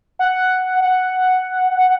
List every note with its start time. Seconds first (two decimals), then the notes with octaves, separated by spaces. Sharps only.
0.19 F#5
0.80 F#5